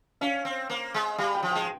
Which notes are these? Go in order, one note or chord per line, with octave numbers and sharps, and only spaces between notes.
C#4 F5
C4
A#3
G#3
G3 F5
G5
F3
G5
G#3